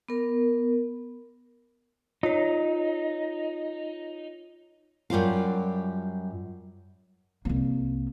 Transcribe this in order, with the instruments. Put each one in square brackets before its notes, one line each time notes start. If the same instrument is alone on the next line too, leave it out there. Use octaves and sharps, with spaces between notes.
[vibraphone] B3 A#4
[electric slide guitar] D#4 [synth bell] F4 C#5
[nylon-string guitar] F#2 G3 F4 F5
[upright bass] C2 A#3